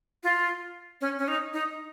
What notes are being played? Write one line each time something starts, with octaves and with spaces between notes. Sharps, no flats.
F4
C#4
C#4
D#4
D#4